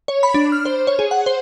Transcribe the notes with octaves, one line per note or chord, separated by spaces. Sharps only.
C#5
B5
D4
F6
C5
C#5
G#4
F#5
C5